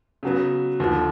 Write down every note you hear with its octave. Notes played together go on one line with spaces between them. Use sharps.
C#3 F#3 B3
D#2 D3 F3